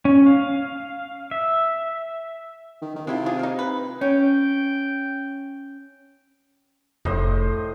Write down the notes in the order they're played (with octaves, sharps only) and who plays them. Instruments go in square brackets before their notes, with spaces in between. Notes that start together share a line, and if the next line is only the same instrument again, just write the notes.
[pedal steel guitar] C#4
F5
E5
[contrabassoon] D#3
D#3
[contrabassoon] C3 [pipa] G#3 E4 F4
[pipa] D4 F4 G#4
A#3 D#4
B4
[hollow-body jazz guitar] C#4 [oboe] G5
[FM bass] F1 [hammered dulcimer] A2 C5 D#5